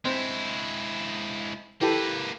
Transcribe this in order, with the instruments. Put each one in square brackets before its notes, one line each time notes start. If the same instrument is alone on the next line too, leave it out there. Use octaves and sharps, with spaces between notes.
[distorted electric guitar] G#3 E4 [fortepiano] C4
[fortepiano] E3 G4 A4 [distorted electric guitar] A#3 B4